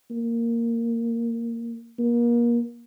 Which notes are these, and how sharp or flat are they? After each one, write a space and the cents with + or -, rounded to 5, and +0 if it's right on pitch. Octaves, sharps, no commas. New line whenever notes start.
A#3 -10
A#3 +30